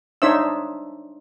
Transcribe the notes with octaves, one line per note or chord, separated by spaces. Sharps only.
D4 D#4 C5 C#5 E5 E6